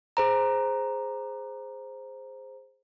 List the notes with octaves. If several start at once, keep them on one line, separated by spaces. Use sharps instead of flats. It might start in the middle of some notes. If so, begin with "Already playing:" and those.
G#4 C5 A#5